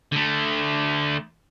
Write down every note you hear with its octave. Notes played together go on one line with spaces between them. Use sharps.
D3 A3